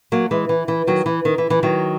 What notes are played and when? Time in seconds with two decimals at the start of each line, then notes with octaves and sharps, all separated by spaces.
0.12 F#3 A#3
0.31 E3 G#3
0.49 E3
0.68 E3
0.87 D#3 F#3
1.06 E3
1.25 D#3
1.38 E3
1.50 E3
1.63 D#3 F#3